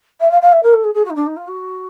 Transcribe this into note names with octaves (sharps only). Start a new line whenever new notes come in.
E5
F5
F5
E5
A#4
A4
G#4
G#4
F#4
D#4
D4
D#4
F4
F#4